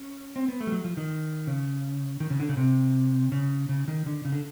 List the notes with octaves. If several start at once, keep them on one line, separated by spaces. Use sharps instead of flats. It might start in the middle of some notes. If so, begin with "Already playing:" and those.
Already playing: C#4
C4
B3
A3
G3
F#3
F3
D#3
C#3
D#3
C#3
D3
C#3
C3
C#3
C#3
D#3
D3
C#3
D3